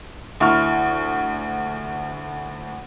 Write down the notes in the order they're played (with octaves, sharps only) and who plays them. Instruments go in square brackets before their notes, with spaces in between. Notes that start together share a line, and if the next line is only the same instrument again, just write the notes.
[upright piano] D2 E4 C#6 F6